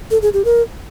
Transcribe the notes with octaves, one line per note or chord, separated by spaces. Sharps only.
A4
G#4
G4
A#4